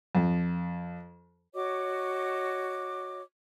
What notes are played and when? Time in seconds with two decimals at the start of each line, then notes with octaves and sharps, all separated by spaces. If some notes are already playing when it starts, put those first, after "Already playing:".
0.15 F2
1.54 F#4 C#5 D#5 D6